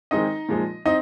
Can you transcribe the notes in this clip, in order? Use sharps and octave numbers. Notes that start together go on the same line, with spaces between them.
D#3 G#3 C4 D#4 D#5
A#2 F3 G#3 D#4
C4 D#4 D#5